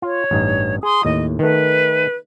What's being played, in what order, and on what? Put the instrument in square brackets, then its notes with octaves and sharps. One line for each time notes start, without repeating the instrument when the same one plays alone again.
[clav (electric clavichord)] F4 [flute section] C#5
[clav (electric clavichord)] A1 G2 D#4
[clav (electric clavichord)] G#4 [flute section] C6 D#6
[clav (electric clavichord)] D#2 A2 [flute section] D#5
[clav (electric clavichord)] D#3 A3 [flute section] B4